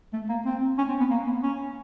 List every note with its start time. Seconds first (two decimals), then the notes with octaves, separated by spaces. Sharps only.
0.13 A3
0.29 A#3
0.45 C4
0.78 C#4
0.89 C4
1.00 B3
1.11 A#3
1.27 B3
1.43 C#4